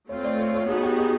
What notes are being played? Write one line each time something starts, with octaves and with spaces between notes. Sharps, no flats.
A3 C4 F4 C#5
D5
C#5
C#5
B3 D#4 F#4 G#4
G4
G#4